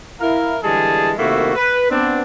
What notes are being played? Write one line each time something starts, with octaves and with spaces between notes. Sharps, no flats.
E4 A#4 F5
D3 E3 G3 G#3 G#4 A5
C3 D#3 A3 A#3 E4 F#4
B4
B3 C4 D4